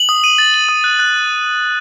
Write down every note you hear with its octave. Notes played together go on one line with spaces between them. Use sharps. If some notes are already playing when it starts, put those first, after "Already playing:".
Already playing: F#7
D#6
D#7
A6
F#7
D#6
F#6
F#6